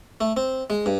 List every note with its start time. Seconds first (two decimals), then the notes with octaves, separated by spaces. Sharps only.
0.21 A3
0.37 C4
0.70 G#3
0.86 G2